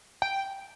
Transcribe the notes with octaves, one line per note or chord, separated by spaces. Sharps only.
G5